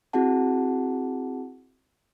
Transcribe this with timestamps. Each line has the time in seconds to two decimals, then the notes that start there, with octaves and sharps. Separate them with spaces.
0.13 C4 E4 F#4 G#4 F#5 A5